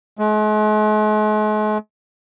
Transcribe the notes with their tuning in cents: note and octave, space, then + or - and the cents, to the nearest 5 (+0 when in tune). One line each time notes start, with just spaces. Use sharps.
G#3 +45